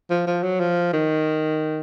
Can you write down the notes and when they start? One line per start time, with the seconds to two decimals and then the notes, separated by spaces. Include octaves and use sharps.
0.10 F3
0.27 F3
0.43 F#3
0.60 F3
0.93 D#3